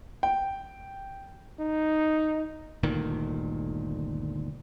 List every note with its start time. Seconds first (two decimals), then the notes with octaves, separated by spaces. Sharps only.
0.23 G5
1.59 D#4
2.83 G1 D2 A#2 D#3